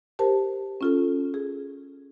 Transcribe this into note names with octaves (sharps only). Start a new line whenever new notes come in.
G4 A#4 C5 A5
C#4 F4 A4
G#4